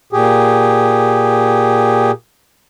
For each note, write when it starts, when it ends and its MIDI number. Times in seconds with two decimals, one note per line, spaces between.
0.13 2.11 46
0.13 2.11 67
0.13 2.11 68